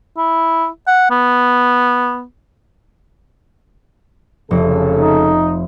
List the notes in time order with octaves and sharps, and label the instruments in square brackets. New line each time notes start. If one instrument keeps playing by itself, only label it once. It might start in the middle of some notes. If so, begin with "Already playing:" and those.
[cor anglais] E4
F#5
B3
[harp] F1 [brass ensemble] C#3 A4
[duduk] D#4